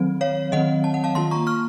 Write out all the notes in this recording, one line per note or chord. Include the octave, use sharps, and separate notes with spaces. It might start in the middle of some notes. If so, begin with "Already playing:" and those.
Already playing: D#3 F#3 C4
C#5 F5
D#3 F#3 C4 D#5 F#5
A5
F#5
F5 A5
D#3 A#3 F4 A5 C6
A#5 C#6
C#6 F6